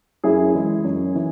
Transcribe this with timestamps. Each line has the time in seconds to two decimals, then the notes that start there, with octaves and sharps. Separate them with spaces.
0.24 F#2 E4 G#4
0.55 E3 G#3
0.84 F#2
1.15 E3